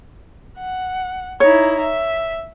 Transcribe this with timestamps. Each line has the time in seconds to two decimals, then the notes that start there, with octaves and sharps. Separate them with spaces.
0.58 F#5
1.40 D#4 E4 C#5
1.81 E5